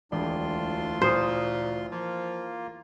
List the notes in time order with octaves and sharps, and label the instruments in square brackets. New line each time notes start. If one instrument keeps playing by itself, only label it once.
[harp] E1 D5 [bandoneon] D2 F4 C6 [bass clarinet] D4
[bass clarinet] A#2 [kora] C5 [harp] C#6 D#6 F6
[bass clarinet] F3 [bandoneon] A#3 F4